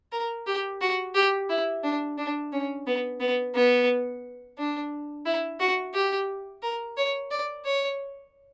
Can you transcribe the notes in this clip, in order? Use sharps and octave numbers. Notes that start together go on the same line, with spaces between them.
A#4
G4
F#4
G4
E4
D4
D4
C#4
B3
B3
B3
D4
E4
F#4
G4
A#4
C#5
D5
C#5